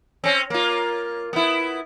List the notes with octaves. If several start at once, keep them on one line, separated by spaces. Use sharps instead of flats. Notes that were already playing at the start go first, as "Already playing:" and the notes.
C4 C#4
A#3 F4
B3 E4